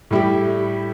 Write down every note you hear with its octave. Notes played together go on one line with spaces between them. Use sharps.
A2 G3 E4 G4